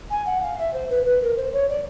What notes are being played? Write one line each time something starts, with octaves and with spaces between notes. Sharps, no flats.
G#5
F#5
F5
E5
C5
B4
B4
A#4
C5
C#5
D5